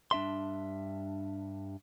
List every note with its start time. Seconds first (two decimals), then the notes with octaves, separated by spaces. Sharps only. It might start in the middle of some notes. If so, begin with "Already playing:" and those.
0.11 G2 D4 E5 C6